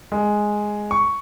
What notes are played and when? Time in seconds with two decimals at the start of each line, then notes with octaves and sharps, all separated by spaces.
0.12 G#3
0.91 C#6